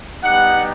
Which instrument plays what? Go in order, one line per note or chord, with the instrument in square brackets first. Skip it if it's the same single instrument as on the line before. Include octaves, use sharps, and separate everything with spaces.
[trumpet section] G3 B3 D#4 G4 F#5